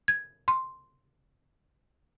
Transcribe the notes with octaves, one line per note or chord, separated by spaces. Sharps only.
G#6
C6